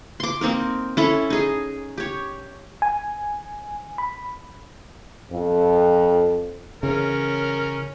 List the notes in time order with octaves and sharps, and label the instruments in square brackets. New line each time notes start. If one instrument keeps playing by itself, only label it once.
[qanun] C6 D6
A#3 C4 D#4 A#4
C#4 E4 A4
D#4 G#4
G4 C#5
[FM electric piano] G#5
B5
[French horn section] F2
[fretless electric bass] C#3 E3 [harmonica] C#4 A#4